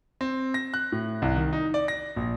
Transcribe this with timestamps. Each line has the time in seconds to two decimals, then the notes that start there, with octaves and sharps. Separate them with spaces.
0.21 C4
0.54 A#6
0.74 F#6
0.92 A2
1.22 C2
1.36 D#3
1.53 D#4
1.74 D5
1.88 A#6
2.16 A#1